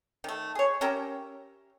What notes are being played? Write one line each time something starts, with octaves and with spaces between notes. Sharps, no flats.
D#3 A3
G#4 C#5
C#4 G4 A#4 E5